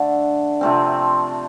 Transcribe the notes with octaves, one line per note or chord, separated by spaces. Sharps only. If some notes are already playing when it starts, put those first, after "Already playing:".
Already playing: D3 A3 D4
C3 F3 A3 C4